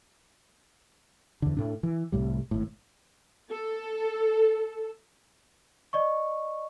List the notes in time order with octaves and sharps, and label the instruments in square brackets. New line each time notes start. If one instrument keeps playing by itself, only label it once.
[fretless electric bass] E2 D3
A2 D4
E3
C2 A2 G3
G#1 A2
[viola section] A4
[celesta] D5 D#5 C#6